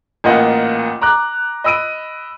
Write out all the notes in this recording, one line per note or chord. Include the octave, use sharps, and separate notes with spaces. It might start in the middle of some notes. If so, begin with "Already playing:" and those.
A1 A#2 A#3 F4 D#5 F#5
A#5 D6 F#6
D#5 B5 E6 D7 D#7